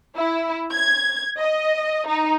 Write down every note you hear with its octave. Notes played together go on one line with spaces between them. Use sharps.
E4
G#6
D#5
D#4